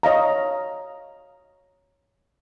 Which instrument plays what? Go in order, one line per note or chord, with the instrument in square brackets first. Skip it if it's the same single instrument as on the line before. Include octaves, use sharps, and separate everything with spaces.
[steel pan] C#5 D#5 F5 A#5